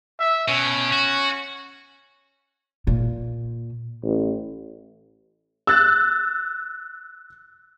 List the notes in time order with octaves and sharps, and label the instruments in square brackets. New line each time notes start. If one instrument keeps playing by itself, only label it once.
[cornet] E5
[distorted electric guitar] B2 [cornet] C#4
[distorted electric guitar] F#4
[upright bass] A#2
[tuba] A1
[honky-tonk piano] E6 F#6 A6